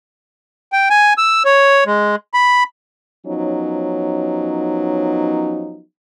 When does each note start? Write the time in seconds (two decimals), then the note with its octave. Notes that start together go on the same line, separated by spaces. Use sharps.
0.72 G5
0.90 G#5
1.18 E6
1.45 C#5
1.86 G#3
2.34 B5
3.26 F3 F#3 B3 C#4 D#4